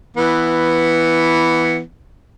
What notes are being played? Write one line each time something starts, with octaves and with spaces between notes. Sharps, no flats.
E3 B3